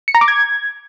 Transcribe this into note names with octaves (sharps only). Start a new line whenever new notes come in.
C#7
A#5
D6
G#6